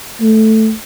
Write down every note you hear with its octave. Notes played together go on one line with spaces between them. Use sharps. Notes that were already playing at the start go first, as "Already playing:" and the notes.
A3